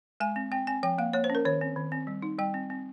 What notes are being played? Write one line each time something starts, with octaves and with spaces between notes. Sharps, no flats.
G#3 G#5
C4
C4 G5
C4 G#5
F3 G5
A#3 F5
A#3 C#5
C5
C#4
A#4
D#3 C#5
C4
D#3
C4
G3
D#4
G3 G5
C4
C4